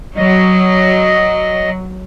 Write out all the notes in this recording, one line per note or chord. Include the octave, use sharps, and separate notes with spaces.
F#3 D#5